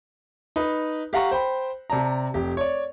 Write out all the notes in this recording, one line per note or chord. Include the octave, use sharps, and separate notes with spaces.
D#4 B4
G4 F5 F#5 A#5 C#6
C5 G5 B5
C3 D5 A5 A#5
F1 G4
C#5 D5